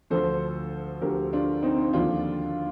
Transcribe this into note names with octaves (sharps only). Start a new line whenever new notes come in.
D2 D3 F3 A4 C5
D2 D3 F3 G4 A#4
D4 F4
C4 D#4
D#2 D3 F3 D4 F4